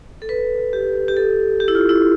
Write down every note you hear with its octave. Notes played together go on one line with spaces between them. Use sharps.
A4
B4
G4
G4
A4
G4
E4
F4
E4